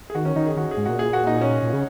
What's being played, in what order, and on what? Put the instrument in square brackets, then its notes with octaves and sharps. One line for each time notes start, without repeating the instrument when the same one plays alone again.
[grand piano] G#4
[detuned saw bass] D#3 [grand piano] F#4
[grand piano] C#4
[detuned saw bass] D#3 [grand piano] D#4
[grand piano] G#4
[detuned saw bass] D#3 [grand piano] F#4
[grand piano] G#4
[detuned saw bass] G#2
[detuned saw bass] A#2 [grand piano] F#4
[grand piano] G#4
F#4
D#4
C#4
[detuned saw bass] A#2
C#3